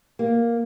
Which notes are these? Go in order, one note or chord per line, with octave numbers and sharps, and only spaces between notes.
A#3